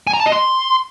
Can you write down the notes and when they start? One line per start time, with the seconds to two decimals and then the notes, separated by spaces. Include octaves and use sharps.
0.07 G#5
0.13 A#5
0.20 A5
0.26 D#5
0.32 C6